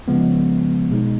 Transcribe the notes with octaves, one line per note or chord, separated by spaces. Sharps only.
C#3 F3 G#3 B3
B2 G#3 D#4